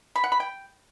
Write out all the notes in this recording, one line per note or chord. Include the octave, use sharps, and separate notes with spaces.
B5
F#5
B5
G5